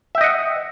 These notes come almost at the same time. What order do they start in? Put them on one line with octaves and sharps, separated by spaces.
E5 G5 D#5 F#5